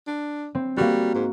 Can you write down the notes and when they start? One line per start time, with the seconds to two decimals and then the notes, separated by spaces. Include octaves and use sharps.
0.07 D4
0.55 C4
0.77 G3 A#3 F#4
1.15 G#2